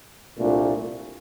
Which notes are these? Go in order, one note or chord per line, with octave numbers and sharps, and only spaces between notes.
C2 A#2 A3 D4 F4